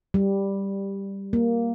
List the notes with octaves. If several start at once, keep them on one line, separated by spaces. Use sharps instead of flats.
G3
A#3